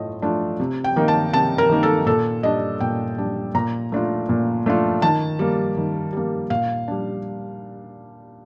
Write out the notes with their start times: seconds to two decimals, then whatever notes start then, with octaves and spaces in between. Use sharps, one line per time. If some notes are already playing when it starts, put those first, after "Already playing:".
Already playing: A2 A3 F4 D#5
0.22 A3 D4 F4
0.60 C3
0.84 G5
0.96 D#3 A#3 D#4
1.08 A5
1.33 C3 A5
1.58 A#4
1.69 D#3 A#3 D#4
1.83 A4
2.06 A#2 A4
2.43 G3 D4 D#5
2.80 A#2 G5
3.18 G3 D4
3.55 A#2 A#5
3.92 A3 D4 F4
4.29 A#2
4.66 A3 D4 F4
5.02 D#3 A5
5.39 G3 A#3
5.77 D#3
6.13 G3 A#3
6.50 A#2 F5
6.88 G3 D4